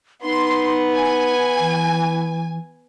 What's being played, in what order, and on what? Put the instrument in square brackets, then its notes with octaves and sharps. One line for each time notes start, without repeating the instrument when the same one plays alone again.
[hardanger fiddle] B3 [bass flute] D#4 [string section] C6
[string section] G#5
[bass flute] E3